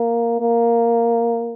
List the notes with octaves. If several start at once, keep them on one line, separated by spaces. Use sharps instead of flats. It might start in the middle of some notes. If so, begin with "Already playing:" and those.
Already playing: A#3
A#3